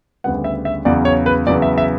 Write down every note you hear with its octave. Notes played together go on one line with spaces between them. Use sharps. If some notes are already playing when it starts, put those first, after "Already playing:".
D2 C#3 G3 B3 F#5
E5
E5
E2 C#3 F#3 B3 D5
C#5
B4
E2 C#3 F#3 B3 D5
E5
E5